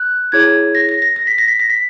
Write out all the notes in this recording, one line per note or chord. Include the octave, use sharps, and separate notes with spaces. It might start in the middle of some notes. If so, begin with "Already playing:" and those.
Already playing: F#6
E4 G#4 C#5 G#6
A#6
A#6
A#6
A#6
B6
A#6
B6
A#6
B6